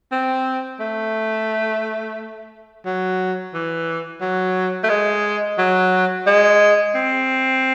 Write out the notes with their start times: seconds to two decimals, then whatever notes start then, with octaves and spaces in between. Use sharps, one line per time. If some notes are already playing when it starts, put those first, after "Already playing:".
0.12 C4
0.80 A3
2.86 F#3
3.54 E3
4.21 F#3
4.84 A3
4.89 G#3
5.58 F#3
6.27 G#3
6.95 C4